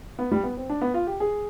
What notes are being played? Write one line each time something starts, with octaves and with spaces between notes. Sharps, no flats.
B3
G3
B3
C4
D4
B3
F4
G4
G#4